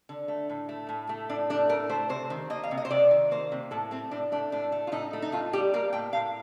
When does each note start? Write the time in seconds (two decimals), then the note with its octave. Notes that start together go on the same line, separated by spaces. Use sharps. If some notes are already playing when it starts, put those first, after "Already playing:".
0.09 D3
0.28 A3
0.50 A2
0.69 A3
0.89 A2
1.09 A3
1.29 A2 D4
1.50 A3 D4
1.69 A2 A#4
1.89 A3 C5
2.09 C3 C5
2.30 D#3
2.50 A#3 D#5
2.63 F5
2.71 C3
2.77 D#5
2.85 C5
2.90 C3 D5
3.11 D#3
3.31 A#3 C5
3.52 C3
3.71 A2 A4
3.91 A3 C4
4.11 A2 D4
4.32 A3 D4
4.52 A2 D4
4.72 A3
4.87 F4
4.92 A2 D#4
5.13 A3
5.22 D#4
5.32 A2 F4
5.53 G3 G4
5.74 A#3 A#4
5.93 A2 G5
6.13 A2 F5